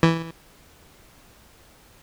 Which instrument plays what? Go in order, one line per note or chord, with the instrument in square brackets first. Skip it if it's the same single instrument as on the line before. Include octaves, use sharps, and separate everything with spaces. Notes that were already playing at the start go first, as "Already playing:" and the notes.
[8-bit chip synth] E3